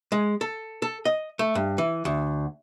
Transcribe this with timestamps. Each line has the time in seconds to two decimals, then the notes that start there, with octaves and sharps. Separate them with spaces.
0.12 G#3
0.41 A4
0.82 A4
1.05 D#5
1.39 A3
1.55 G2
1.78 E3
2.05 D2